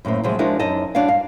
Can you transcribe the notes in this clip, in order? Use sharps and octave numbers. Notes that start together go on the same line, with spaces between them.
F#2 A2 A#3 C4
A2 C3 F3 F#3 G#3 A#3
F3 G#3 D4 E4 F#4 A#4
F#2 D#4 D#5 A5
G3 D4 F#4 C#5 F5
G2 F5